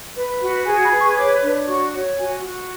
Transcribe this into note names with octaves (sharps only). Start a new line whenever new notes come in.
B4
F#4
G#4 G#5
B5
B4
C#6
C#5 D6
D4
F#4 C#6
C#5
F#4 G#5
F#4